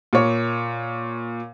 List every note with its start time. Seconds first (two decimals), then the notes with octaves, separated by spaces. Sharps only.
0.13 A#2 C#5